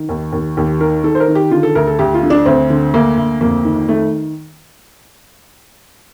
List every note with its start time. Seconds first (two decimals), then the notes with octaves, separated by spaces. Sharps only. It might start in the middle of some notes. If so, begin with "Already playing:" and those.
Already playing: D#3
0.09 D#2
0.33 D#2
0.57 D#2 G4
0.80 D#3 A#4
1.03 D#3 A4
1.15 C5
1.20 A#4
1.28 D#3
1.35 G4
1.51 D3 F4
1.63 A4
1.75 D2 A#4
1.88 A4
1.99 D2 G4
2.14 F4
2.23 D3
2.30 D4
2.46 D2 C4
2.70 D3
2.94 D2 A#3
3.18 D2
3.41 F2 A#3
3.65 D#3
3.88 D#3 A3